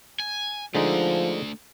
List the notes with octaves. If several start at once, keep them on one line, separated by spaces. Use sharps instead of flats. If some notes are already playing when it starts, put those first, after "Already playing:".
G#5
D3 F3 G#3 A3 D4 D#4